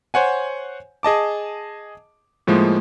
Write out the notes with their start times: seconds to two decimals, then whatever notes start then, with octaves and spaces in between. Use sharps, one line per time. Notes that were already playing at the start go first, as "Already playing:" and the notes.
0.14 C5 C#5 F#5 G#5
1.03 G#4 D#5 A5 D6
2.47 A2 F3 G#3 A#3